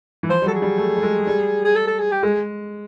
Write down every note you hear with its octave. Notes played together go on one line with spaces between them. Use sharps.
E3
F3 C5
G3
F#3 A4
G#4
G3
A3
G3
G#3
G3
G#4
A4
A4
G#4
G4
G#3 G#4